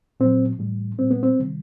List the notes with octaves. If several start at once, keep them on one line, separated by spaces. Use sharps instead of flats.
A#2 F#3 C4
A2 E3 G3
A#2 G3 C4
B3
C4
C3 D#3 G3